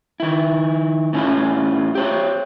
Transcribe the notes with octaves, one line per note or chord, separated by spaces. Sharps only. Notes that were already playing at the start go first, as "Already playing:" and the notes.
D#3 E4
A2 C#4 E4 F4
G4 C5 C#5